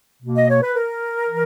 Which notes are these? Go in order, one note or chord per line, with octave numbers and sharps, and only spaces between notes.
B2 A#3
D#5
C#5
B4
A#4
E3